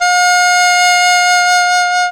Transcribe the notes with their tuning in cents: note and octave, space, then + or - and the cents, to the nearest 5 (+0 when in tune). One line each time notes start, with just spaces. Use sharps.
F5 +45